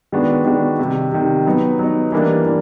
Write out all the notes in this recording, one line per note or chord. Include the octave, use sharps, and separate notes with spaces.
D#3 G#3 B3 D4 F#4
D#3 G#3 B3 D4 F#4
C3 D#3 G3
C3 D#3 G3
F#3 B3 D#4
F#3 B3 D#4
E3 G3 A#3 D4
E3 D4